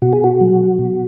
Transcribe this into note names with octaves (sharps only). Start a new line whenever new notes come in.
B2 F#4
G#4
F#4
F#3
B2